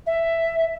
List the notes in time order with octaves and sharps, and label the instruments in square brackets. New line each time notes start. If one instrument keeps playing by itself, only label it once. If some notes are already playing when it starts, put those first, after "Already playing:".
[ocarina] E5